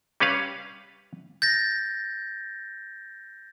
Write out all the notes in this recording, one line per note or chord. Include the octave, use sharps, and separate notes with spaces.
G3 C#4 B4 F5
G6 A6 A#6